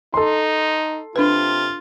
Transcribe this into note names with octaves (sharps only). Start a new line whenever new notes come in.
D#4 A4 C6
C3 D4 F4 B4